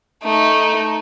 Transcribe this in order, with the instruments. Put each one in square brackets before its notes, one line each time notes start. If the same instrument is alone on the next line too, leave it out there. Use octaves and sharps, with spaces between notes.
[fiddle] A3 D#4